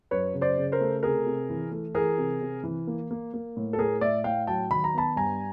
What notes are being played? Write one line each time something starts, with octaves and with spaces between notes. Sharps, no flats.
F#2 B4 C#5
C#3
C5 D5
C#3
A#4 C5
A3
C3 G#4 A#4
C3
E3
A3
E3 G#4 A#4
C3
C3
E3
A#3
A#3
A#3
A2
A4
A2 G#4 A#4
A2 D5 E5
A2 F5 G5
F#3 G5 A5
D#3 B5
A#5
B3 A5 B5
G2 G#5 A#5